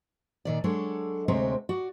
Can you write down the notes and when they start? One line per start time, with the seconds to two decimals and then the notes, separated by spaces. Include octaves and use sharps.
0.45 A#2 D#3 D5
0.64 F#3 G#3 D4 A4 C#5
1.28 D2 C3 G#3 C4 C#5 A#5
1.69 F#4 D5